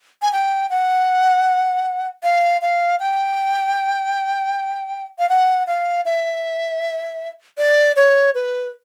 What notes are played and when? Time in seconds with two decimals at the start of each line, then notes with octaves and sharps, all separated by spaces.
0.22 G#5
0.33 G5
0.70 F#5
2.23 F5
2.62 F5
3.00 G5
5.19 F5
5.29 F#5
5.67 F5
6.05 E5
7.58 D5
7.96 C#5
8.35 B4